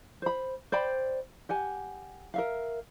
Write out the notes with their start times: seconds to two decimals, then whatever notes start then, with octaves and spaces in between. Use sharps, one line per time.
0.22 C5 B5
0.72 C5 D5 G5 B5
1.49 G4 F#5 G#5
2.34 A#4 E5 F5